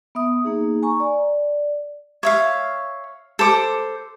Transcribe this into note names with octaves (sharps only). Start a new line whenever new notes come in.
B3 E5 D#6
A#3 D#4 G#4
G#5 A#5 C#6
D5
C#5 E5 F5
A4 C5 D6